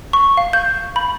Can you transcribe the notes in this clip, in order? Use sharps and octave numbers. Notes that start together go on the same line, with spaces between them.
C#6
F5
G6
B5